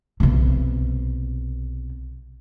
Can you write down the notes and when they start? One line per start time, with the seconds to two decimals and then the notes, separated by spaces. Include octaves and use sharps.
0.20 B1 C3